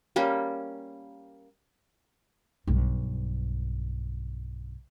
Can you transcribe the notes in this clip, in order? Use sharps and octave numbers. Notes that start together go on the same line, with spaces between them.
G3 A#3 C#4
B1 G2